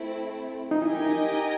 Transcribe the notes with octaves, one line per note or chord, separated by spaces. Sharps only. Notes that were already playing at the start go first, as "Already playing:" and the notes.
Already playing: A3 C4 E4
D#4
E4 G4 A#4 D#5 G#5
D#4